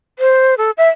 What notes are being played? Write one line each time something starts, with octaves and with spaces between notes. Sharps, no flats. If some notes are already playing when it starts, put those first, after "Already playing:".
C5
A4
E5